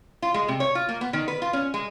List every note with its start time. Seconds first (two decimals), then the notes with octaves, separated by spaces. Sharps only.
0.22 F4
0.34 G#3
0.48 C3
0.60 C#5
0.75 F4
0.89 A#3
1.01 B3
1.13 D#3
1.28 B4
1.42 F4
1.53 C#4
1.74 G#3